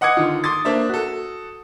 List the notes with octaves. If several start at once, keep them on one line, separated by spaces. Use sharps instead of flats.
D#5 F#5 D6 D#6 G#6 C#7
D3 D#3 F4
C6 D6 D#6 A6
A#3 D4 C5 E5
F#4 A4